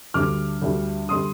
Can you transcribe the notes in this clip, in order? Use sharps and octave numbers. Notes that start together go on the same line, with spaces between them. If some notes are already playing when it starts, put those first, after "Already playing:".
D2 D3 G3 D6 F6
D2 D3 G3
D3 G3 C6 D#6